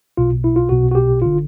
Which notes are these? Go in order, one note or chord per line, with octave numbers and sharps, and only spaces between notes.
B1 B2 F4
E4
F4
B1 B2 F#4
F#4
G4
G1 D3 F4